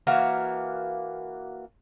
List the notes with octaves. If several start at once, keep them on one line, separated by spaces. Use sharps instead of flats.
E3 A#3 F#4 F5